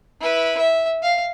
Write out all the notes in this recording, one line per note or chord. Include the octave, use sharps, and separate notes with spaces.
E4 B4
E5
F5